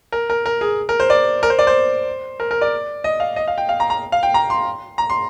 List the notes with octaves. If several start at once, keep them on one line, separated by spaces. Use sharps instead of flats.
A#4
A#4
A#4
G#4
A#4
C5
D5
A#4
C5
D5
C5
A#4
A#4
D5
D#5
F5
D#5
F5
G5
F5
A#5
A#5
F5
G5
A#5
C6
A#5
C6